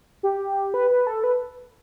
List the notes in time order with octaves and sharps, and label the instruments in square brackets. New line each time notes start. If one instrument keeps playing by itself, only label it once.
[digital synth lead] G4
B4
B4
A4
B4